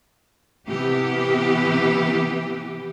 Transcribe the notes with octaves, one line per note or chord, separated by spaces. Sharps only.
C3 E3 B3 G4